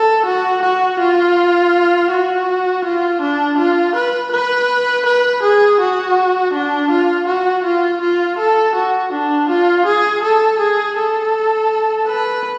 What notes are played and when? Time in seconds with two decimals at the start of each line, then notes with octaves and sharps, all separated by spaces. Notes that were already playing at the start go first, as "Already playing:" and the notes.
Already playing: A4
0.25 F#4
0.62 F#4
0.99 F4
2.11 F#4
2.84 F4
3.21 D4
3.58 F4
3.95 B4
4.32 B4
5.06 B4
5.43 G#4
5.80 F#4
6.53 D4
6.90 F4
7.27 F#4
7.64 F4
8.01 F4
8.38 A4
8.75 F#4
9.12 D4
9.49 F4
9.86 G#4
10.23 A4
10.59 G#4
10.96 A4
12.07 B4